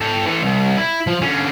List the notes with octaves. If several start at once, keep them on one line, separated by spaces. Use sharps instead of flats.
A4 G5
E3 A4
C2
E4
F3
D3 C#4